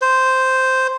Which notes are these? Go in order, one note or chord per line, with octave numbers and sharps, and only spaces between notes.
C5